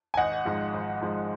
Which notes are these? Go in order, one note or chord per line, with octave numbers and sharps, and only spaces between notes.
G#5
G#1 D#5 F#5
G#2 F3 G#3
G#1
G#2 F3 G#3